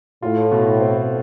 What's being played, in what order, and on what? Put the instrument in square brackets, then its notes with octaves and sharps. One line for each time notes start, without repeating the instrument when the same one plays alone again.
[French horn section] A2 [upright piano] F4
[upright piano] B2
C4